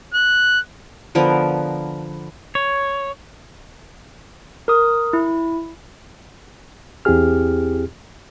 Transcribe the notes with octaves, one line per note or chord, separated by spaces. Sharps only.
F#6
D3 F3 B3 A#4
C#5
A#4 D#6
E4
E2 C4 E4 G4 G#4 F6